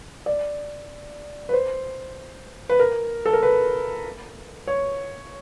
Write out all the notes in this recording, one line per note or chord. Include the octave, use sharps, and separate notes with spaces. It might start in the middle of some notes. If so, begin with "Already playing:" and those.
D5
B4
C5
B4
A#4
A4
A#4
B4
C#5